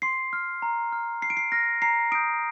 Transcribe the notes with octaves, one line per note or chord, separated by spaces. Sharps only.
C6 C7
F6
A#5
F6
A#5 C7
D7
C7
F6 A#6
A#5 C7
D#6 G6 D7